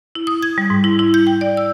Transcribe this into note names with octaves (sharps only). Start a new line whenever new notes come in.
E4
D#6
G#6
G3
G#2
E4
E4
G6
G5
D5
E6